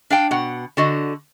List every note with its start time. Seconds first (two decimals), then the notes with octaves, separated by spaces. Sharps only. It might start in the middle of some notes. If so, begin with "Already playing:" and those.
0.10 D4 F5 G5
0.31 B2 F#5
0.77 D3 F#4 D#5